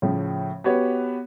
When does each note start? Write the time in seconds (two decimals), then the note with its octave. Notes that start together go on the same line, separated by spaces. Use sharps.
0.02 A2 C#3 F3
0.64 B3 F#4 G4 B4 C#5